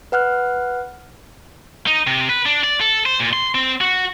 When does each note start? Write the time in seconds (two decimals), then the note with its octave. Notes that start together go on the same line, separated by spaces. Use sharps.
0.12 B4 F#5 F6 F#6
1.87 D#4
2.07 C3
2.30 B4
2.46 D4
2.64 D5
2.81 A4
3.06 C5
3.20 A#2
3.33 C6
3.55 C4
3.81 F#4